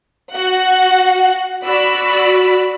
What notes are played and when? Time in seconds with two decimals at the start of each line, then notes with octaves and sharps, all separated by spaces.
0.34 F#4 F#5
1.65 F#4 D5 B5 E6